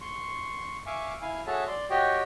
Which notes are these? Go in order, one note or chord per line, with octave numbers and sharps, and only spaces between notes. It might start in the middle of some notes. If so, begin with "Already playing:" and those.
C6 C#6
E5 F5 G#5 C#6 D6
E4 F5 G#5
F#4 G#4 A4 C#5 E5 A5
D5 C6
F#4 G4 C#5 D#5 G5